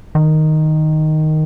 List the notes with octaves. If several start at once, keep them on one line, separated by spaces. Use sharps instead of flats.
D#3